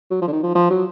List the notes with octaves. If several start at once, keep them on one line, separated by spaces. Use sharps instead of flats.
F#3
F3
D3
D#3
F3
F3
F#3